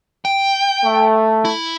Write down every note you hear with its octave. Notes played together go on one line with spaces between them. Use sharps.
G5
A3
E4